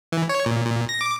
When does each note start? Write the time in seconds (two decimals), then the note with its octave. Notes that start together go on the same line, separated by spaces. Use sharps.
0.12 E3
0.29 C#5
0.46 A#2
0.66 A#2
0.89 A#6
1.01 D6